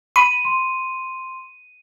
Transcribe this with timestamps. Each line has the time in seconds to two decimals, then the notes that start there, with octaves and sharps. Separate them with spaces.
0.16 B5 D#7
0.45 C6